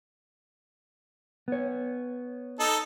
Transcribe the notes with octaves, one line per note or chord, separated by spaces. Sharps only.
B3 C#5
D#4 A4